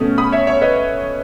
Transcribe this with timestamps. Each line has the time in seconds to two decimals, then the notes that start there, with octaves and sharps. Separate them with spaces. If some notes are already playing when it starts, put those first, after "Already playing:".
Already playing: B2 A3 C#4 D#6
0.18 B5 D#6
0.32 C#5 E5
0.47 C#5 E5
0.62 B4 D#5